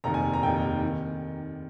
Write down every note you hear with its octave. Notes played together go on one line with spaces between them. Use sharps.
F1 D#2 D#3 A#5
G#5
A#5
F1 D#2 D#3 G5
D#3